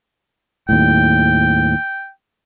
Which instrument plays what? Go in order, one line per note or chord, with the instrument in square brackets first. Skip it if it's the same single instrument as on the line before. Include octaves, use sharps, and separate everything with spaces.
[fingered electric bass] D#2 A2 [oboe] G5